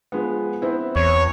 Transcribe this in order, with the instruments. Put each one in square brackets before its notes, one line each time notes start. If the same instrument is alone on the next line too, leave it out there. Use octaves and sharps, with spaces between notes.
[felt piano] F3 G#3 B3
B3 C4 E4
[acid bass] E2 [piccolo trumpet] C#5